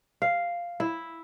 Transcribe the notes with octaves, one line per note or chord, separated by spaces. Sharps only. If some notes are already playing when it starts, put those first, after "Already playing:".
F5
E4